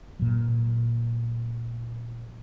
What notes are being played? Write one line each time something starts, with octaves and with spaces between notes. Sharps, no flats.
A#2 F#3